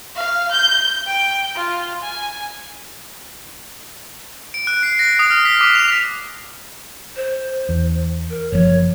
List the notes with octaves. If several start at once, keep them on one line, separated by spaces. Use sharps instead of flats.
F5
G6
G5
F4
G#5
D7
F#6
C7
A#6
D#6
F6
B6
D6
F7
C5
E2
A#4
F#1 F3 C#5